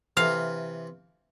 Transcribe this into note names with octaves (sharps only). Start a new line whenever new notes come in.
C3 E3 F5